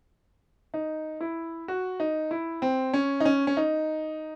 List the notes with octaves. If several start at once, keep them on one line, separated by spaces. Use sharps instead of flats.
D#4
E4
F#4
D#4
E4
C4
C#4
D#4
C#4
C#4
D#4